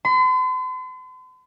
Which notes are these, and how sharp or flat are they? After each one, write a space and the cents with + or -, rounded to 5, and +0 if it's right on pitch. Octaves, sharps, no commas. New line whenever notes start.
C6 -45